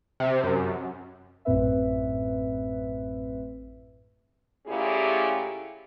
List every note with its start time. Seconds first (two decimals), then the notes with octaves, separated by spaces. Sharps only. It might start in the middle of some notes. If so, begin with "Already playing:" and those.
0.20 C3
0.44 F#2
1.45 A1 F#2 A2 C4 B4 E5
4.67 A#2 A3 C#4 E4 G4 G#4